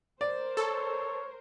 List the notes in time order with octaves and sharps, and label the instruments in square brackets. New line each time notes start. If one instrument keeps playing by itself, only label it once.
[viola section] A#4 C5 [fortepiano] D5
[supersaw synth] A4 [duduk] C#5